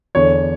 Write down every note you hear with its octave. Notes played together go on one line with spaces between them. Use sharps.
E2 D3 C#5